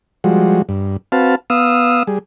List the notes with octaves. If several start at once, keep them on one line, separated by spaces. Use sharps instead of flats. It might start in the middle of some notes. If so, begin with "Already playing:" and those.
F3 G3 G#3 F#4
G2
C4 F#4 B4 F5 A5
B3 F5 D#6 E6
G3 G#4